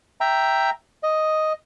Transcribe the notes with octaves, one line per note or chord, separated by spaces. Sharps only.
E5 G5 A#5
D#5